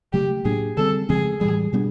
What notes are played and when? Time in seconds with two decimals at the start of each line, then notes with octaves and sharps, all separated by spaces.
0.13 C#3 F#3 A3 G4
0.45 A2 F#3 A#3 D4 G#4
0.77 D3 G3 C4 A4
1.09 C#3 F3 G#3 C4 G#4
1.40 A2 E3 G3 G#4
1.73 B2 G3 B3 D4